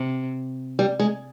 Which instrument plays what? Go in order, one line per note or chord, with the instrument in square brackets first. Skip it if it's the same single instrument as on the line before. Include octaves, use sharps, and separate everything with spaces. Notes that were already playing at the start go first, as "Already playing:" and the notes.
Already playing: [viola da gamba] C3
[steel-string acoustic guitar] G3
G#3